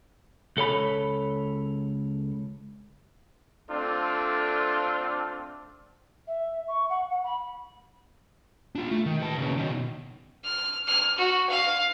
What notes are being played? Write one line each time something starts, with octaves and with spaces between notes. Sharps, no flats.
C#2 A4 C#5 B5
A3 C4 D4 F4 A4
E5
C#6
F#5
F#5
B5
D4 F4
A3
D#3
B4 A5
A#2 C#3
B2 D#3
F6
F6
F#4
F5